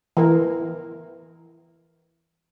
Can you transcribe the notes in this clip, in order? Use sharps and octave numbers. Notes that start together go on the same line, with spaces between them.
E3 A#4